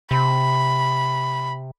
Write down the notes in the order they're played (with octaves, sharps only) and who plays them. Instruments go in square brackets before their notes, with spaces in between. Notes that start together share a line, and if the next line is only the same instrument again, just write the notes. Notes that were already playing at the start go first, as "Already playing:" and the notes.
[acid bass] C3 [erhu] B5